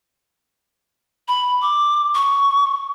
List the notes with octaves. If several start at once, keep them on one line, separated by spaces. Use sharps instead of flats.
B5
D6
C#6